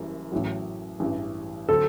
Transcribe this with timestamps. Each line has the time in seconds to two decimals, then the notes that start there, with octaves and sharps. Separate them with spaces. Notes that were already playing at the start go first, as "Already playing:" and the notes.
Already playing: F#1 F#2 E3 G3
0.32 A1 A2 F#3
1.00 A1 G2 E3 G3
1.69 D3 F#3 C4 A4